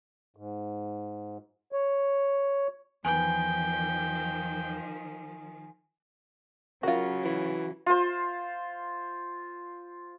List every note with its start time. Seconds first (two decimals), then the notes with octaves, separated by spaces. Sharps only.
0.36 G#2
1.72 C#5
3.05 E2 D#3 F3 B4 G5 G#5
6.83 C#3 F#3 F4 F#4 A#4
7.24 E3
7.86 F4 C5